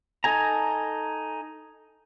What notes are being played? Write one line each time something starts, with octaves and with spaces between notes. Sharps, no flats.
D#4 A4 G#5 A#5